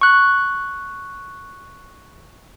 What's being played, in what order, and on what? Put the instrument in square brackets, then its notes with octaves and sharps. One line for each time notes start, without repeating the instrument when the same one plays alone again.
[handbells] C#6 F#6